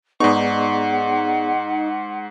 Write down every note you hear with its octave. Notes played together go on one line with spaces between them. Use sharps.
G#2 B3 D#4 G#4 D5 F#5 C#6